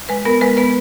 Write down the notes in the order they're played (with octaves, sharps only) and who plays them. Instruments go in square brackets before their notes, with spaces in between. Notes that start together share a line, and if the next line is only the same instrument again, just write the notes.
[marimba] G#3 B4
B3 A#4
G#3 B4
B3 B4